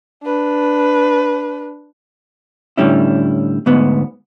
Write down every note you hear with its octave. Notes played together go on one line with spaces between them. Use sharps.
D4 B4
A2 D3 G3 C#4 E4
D2 G#2 B3